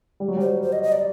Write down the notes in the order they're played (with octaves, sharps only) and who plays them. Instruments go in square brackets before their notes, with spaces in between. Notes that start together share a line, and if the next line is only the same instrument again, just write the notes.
[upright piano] G3
F#3
[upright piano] G3 [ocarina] C5
[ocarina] C5
D#5
D#5
D5